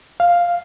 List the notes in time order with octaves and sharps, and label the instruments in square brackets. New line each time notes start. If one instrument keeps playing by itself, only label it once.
[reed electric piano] F5